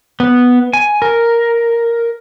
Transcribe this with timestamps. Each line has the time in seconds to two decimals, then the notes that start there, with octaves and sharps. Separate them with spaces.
0.20 B3
0.73 G#5
1.02 A#4